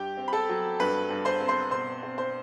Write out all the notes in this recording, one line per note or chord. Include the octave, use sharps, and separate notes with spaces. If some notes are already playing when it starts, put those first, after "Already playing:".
Already playing: G2 G4 G5
C4
B5
A4 A5
F#3
G2 B4 B5
G2
C5 C6
C4
C5 C6
B2 C5 C6
C4
C5 C6